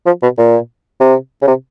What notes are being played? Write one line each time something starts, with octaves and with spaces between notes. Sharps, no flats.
F3
B2
A#2
C3
C#3
C3